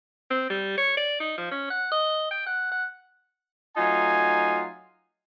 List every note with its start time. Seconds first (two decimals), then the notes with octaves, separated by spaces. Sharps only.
0.31 C4
0.50 G3
0.78 C#5
0.97 D5
1.20 D#4
1.38 F3
1.52 C#4
1.71 F#5
1.92 D#5
2.31 G5
2.47 F#5
2.72 F#5
3.77 F#3 A3 D#4 F4 G#5